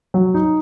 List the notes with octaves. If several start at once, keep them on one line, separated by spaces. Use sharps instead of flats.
F#3
D#4